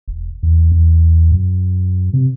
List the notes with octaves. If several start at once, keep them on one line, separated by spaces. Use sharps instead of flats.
E1
E2
E2
F#2
C3